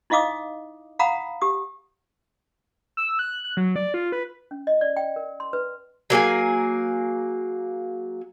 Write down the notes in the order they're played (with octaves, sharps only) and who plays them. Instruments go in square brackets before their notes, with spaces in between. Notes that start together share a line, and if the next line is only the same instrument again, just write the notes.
[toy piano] D#4 E4 D#5 F5 D6 D#6
F5 F#5 A#5 B5 D#6
G4 D#6
[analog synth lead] E6
F#6
F#6
F#3
D5
F4
B4
[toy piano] C#4
D#5
D5
G5
A#4
C6
B4
[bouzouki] F#3 A#3 G#4 G#5